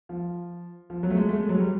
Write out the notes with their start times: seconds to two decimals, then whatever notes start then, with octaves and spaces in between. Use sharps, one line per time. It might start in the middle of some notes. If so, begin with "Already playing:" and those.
0.09 F3
0.90 F3
1.03 F#3
1.10 A3
1.16 G#3
1.29 A3
1.40 G#3
1.49 F#3
1.59 G3